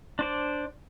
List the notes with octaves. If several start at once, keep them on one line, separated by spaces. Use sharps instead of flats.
D4 C5 D5